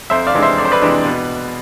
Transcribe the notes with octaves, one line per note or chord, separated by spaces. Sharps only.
F2 C5 E5
D5 F5
C3 E3 G#3 D4
C5 E5
F2 D5
C5
B4 D5
C3 E3 G#3 D4
B2